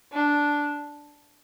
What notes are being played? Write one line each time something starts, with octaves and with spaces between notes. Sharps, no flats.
D4